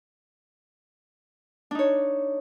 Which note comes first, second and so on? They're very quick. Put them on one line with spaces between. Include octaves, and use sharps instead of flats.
D4 D#4 C#5